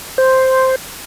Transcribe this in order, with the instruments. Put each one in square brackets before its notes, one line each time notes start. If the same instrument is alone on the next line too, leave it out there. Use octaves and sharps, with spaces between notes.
[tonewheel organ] C5